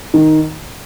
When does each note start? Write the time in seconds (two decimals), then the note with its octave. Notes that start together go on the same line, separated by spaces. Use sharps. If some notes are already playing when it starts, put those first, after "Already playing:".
0.14 D#3